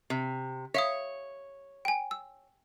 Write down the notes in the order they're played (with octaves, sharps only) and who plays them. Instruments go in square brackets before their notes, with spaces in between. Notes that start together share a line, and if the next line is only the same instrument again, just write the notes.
[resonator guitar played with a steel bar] C3
[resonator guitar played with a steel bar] C#5 [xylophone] E5 F5 D#6
[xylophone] G5 G#5
E6